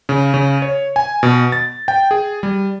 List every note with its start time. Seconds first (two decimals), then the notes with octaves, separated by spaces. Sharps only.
0.09 C#3
0.34 C#3
0.62 C#5
0.96 G#5
1.23 B2
1.52 A6
1.88 G5
2.11 G#4
2.43 G3